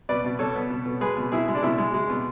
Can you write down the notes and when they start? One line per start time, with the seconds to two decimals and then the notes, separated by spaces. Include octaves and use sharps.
0.09 B2 B4 D5
0.24 B2
0.39 B2 A4 C#5
0.55 B3
0.70 B2
0.86 B2
1.01 G#3 G#4 B4
1.17 B2
1.32 B2 E4 G#4
1.48 G#3
1.55 D4
1.63 B2 E4
1.78 G#3
1.94 G#3
2.10 B2